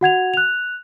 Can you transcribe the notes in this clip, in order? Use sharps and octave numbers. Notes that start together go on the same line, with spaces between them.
F#4 F#5 G#6 F7
F#6 F7